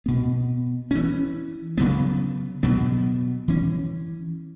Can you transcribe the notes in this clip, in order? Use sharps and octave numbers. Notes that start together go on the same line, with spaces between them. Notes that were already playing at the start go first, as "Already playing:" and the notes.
B2 B3
E3 C#4
C#3 F#3 B3
B2 F#3 B3
E3 C#4